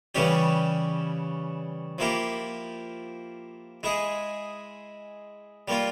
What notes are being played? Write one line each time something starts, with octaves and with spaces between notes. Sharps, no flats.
C#3 E3 G3 C#4 G4
F3 A#3 E4 G4
G#3 E4 G#4
G3 A#3 F4